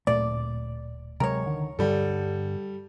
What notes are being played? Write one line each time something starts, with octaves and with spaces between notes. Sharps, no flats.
D1 A#2 A3 D5
C3 F#3 G#3 A#4 C#5
D3 D#3
G2 D3 G3 A4